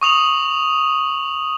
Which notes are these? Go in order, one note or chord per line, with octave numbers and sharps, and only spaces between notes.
C#6 D#6 F7 F#7